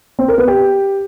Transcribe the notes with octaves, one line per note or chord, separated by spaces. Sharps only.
C4
A#4
B3
G4